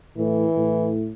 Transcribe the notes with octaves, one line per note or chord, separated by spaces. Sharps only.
A2 E3
A2